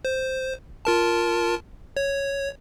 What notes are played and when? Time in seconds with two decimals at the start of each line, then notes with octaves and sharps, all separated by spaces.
0.05 C5
0.85 F4 A#4 A5
1.97 C#5